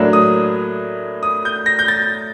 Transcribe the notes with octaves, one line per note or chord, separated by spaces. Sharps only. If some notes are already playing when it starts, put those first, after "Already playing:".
Already playing: A2 F#3 A#3 D4
D#6
D#6
G6
A#6
G6
A6